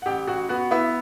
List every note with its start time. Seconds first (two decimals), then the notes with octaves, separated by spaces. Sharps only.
0.02 F#5
0.06 A1 G4 G5
0.27 A1 F#4 F#5
0.49 B3 F#4 F#5
0.71 B3 E4 E5